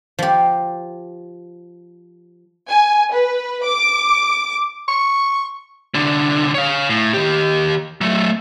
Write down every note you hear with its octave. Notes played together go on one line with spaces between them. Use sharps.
F3 G4
G#5
B4
D6
C#6
C2 D3
C#5 F5
A2
D#3 G4
F#3 A3